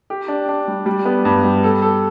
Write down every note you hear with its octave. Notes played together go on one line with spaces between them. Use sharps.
G4
D4
D4
G3
G3
B3
G2
G3
A4
A4